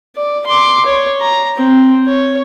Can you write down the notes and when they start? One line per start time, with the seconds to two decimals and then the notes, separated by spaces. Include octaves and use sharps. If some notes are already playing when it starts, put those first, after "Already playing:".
0.16 D5
0.46 C6 D6
0.86 C#5
1.21 A#5
1.57 C4
2.07 C#5